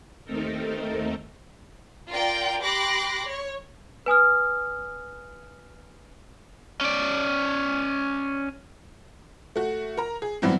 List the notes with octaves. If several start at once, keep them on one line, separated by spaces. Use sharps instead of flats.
D#2 A3 C4 D#4 A4 A#4
F4 A#4 D5 G5
G4 B5 C6 D6 F#6 A#6
C#5
B4 G#5 D#6 F6
C#4 D5
A3 F#4
A#4 A#5
G#4
G2 E3 F#3 B3 C4